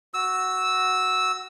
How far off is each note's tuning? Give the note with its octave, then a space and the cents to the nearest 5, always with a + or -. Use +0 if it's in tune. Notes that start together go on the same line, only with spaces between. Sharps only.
F#4 +0 E6 -10